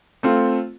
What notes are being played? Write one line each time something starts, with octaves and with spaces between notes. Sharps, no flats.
A3 C4 F4